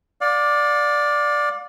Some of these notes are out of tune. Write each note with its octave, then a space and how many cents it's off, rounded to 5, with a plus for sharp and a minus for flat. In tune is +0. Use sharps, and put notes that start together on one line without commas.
D5 +0 F5 +40